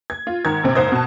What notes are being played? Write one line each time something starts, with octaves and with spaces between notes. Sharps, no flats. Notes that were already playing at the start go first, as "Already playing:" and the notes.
G#6
F4
G#2 D#3 G#6
A#1 C3 C4
F#1 G#2 C5 D#6 G#6
B2 A5